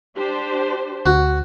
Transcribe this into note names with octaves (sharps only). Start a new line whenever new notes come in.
D4 G4 C5
D2 F#4